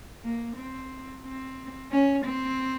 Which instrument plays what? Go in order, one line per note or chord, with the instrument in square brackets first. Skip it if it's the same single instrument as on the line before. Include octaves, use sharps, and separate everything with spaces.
[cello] A#3
C4
C4
C#4
C4